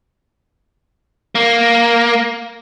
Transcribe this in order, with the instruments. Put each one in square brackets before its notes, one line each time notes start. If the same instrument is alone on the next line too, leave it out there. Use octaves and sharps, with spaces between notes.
[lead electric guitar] A#3